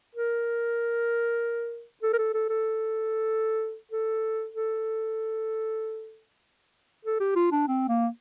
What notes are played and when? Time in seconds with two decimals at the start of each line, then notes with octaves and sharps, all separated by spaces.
0.15 A#4
2.03 A4
2.13 A#4
2.18 A4
2.34 A4
2.49 A4
3.91 A4
4.54 A4
7.05 A4
7.20 G4
7.35 F4
7.51 D4
7.68 C4
7.88 A#3